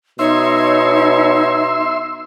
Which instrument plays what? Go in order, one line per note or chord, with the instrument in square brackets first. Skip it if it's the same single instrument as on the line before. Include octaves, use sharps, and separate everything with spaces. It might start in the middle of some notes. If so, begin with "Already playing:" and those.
[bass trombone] B2 [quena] D#4 [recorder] C#5 [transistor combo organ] E5 C6